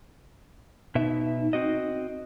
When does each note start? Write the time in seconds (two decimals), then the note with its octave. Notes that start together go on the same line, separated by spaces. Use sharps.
0.95 B2 D#4 E5
1.53 C4 F#4 D#5